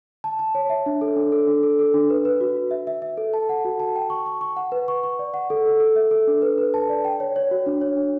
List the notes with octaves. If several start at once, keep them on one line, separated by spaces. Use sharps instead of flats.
A5
A5
C#5
E5
D4
A4
D4
A4
D4
A4
A4
D4
B4
B4
F#4
F#4
E5
E5
E5
A4
A5
F#5
F#4
A5
G5
C#6
C#6
C#6
F#5
B4
C#6
C#6
D5
F#5
A4
A4
A4
E5
A4
D4
B4
B4
A5
D5
G5
C#5
C#5
F#4
D4
C#5
D4